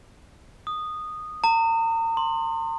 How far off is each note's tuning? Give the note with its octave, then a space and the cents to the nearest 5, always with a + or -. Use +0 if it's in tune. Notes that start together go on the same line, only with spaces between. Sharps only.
D#6 -10
A#5 -40
C6 +15